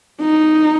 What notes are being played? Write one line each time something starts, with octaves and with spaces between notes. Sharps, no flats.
D#4